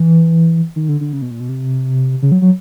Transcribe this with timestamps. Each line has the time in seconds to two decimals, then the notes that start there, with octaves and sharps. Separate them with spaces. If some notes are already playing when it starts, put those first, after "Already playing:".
Already playing: E3
0.76 D#3
0.89 D3
1.01 D3
1.13 C#3
1.22 B2
1.31 A#2
1.40 B2
1.49 C3
2.22 C#3
2.32 F#3
2.42 F#3